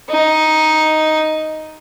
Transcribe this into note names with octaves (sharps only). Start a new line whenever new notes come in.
D#4